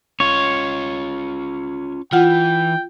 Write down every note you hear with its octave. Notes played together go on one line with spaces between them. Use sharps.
C#4 F4 C#5
E3 F4 F#5 G5